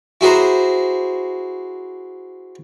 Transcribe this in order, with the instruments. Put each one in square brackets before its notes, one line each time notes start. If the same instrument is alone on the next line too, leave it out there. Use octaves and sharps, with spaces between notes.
[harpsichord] E4 F#4 G#4 C5 A#5